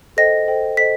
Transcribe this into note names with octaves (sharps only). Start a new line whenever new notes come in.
A4 C5 D#5 G5 A#6
A4 C5 D#5 G5
A4 C5 D#5 B6